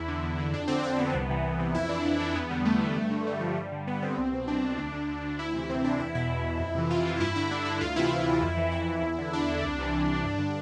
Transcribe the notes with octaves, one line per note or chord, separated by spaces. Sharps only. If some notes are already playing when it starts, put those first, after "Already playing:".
Already playing: E2 E4
D3
E2
D3
F2 D4
D3 C4
F2 C4
D3 B3
C2
C3 E3
C2
C3 E3
F2 E4
E3 D4
F2 D4
E3 D4
E2 B3
D3 G3
E2 A3
D3
G2
D3
G2 G3
D3 F3
G2 G3
D3
G2 B3
D3 C4
C2
B2
C2 D4
B2
D2
D3
D2
D3
D2 E4
C3 E3
D2 C4
C3 E3 D4
E2 E4
B2 E4
E2
B2
F2
C3 E3
F2 F4
C3 E3
G2 E4
D3 E4
E4
G2 D4
D3 E4
D2 F4
C3 E3 E4
D2
C3 E3
F2
E3
F2 E4
E3
E2
D3
E2 D4
D3
C2
C3 E3
C2
C3 E3
G2
D3